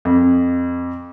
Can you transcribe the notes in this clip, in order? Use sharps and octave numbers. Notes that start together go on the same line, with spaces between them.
F2